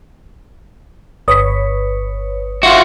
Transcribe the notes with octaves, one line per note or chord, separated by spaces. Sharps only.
G1 B4 C#5 D#6 B6
F4 F#4 E5